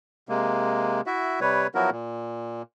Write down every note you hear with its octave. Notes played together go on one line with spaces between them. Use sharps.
C3 G#3 A#3
E4 F#4 E5
C3 G3 B4 C#5
F3 F#3 B3 E4 F#4 A#4
A#2